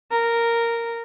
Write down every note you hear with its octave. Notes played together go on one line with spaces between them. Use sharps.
A#4